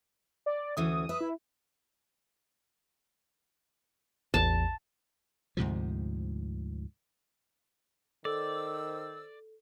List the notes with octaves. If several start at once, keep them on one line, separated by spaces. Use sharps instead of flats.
D5
D2 E3 C#4 D#6
B4 E5
E4
A1 E2 A5
D2 G#2 C3 F3
D#3 A4 C5 D5 E6